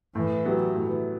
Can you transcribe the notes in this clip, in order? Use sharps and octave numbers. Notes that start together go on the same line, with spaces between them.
A2 E3
F#3 B3 E4 G4
A2